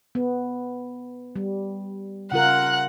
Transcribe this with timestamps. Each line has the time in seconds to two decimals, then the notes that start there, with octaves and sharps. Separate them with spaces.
0.15 B3
1.36 G3
2.32 C#3 F4 A#4 F#5 F#6